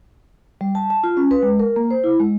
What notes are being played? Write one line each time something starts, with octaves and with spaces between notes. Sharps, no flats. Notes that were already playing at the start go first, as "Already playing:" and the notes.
G3
A5
A5
F4
C#4
B4
G#3
A#4
A#3
C5
E4
G#3